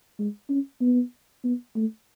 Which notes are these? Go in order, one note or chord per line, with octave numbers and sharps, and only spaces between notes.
G#3
C#4
B3
B3
A3